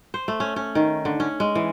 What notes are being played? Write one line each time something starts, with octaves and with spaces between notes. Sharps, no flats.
C5
A3
C#4
C#4
D#3
D3
C#4
G#3
E3